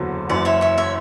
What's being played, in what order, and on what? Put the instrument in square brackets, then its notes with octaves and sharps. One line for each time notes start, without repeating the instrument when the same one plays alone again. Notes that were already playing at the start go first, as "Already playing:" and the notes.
Already playing: [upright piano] F#1 E2 D3 F#3
[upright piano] F#1 F#2 E3 [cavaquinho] D5
[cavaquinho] C#5 E5
C#5 E5
C#5 E5